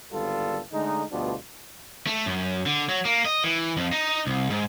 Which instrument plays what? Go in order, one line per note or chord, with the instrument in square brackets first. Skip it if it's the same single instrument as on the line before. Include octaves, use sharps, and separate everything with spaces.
[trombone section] G#1 D3 G3 B3 F4 A4
D3 G#3 A3 D#4
D2 B2 G3 B3 D4 F4
[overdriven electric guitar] A3
F#2
D3
F#3
A#3
D#5
E3
F2
D#4
C2
G#2